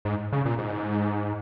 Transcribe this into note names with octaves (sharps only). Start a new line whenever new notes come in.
G#2
C#3
A#2
G#2